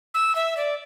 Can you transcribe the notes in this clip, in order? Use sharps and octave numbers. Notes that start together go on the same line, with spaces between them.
E6
E5
D5